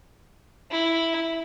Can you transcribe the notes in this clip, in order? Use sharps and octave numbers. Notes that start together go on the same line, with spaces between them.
E4